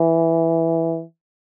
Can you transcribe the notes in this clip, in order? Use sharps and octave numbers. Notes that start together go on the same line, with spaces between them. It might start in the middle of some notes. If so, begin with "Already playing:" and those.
Already playing: E3